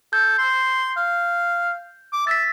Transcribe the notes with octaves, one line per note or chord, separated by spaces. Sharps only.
A4 G6
C6
F5
D6
E5 A6 B6